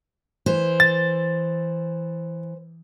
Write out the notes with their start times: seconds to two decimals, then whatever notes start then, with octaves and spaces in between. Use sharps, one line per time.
0.46 E3 C5
0.80 A6